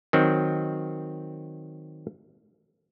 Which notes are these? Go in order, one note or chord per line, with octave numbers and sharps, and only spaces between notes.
D#3 F#3 C4